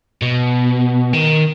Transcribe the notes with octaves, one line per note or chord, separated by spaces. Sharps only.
B2
D#3